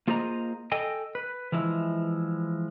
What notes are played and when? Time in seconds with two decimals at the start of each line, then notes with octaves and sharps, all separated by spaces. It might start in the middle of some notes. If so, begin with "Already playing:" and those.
0.07 A#3 F4 G#4 C5 D#5 A#5
0.72 A4 D#5 G5 G#5
1.15 B4
1.52 E3 F3 G#3 E4